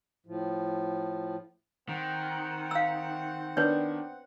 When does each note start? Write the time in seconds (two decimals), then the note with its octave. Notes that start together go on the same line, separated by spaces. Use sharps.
0.27 A2 F3
1.89 D#3 C4 F#5
2.71 F5 E6
3.57 D#3 B3 D4 B4 C#5